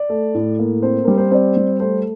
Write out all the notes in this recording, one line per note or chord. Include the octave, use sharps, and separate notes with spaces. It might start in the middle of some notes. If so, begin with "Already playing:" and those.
Already playing: D5
A3
A2
A#3
C4 C5
G3 A#4
C5
C4 D5
G3
A3 C5